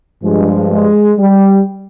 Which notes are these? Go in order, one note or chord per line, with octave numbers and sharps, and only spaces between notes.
G2 F3 G#3
G#3
G3